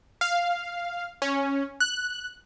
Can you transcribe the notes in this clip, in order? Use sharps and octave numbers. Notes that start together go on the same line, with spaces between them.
F5
C#4
F#6